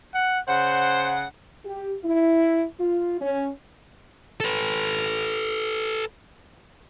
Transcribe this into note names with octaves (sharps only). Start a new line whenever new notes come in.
F#5
C#3 C5 F#5
G4
E4
F4
C#4
A4 B4